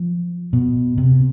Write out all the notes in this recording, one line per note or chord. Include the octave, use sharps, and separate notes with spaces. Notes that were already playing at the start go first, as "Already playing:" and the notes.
Already playing: F3
B2
C3